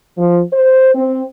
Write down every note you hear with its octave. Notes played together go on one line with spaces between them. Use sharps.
F3
C5
C4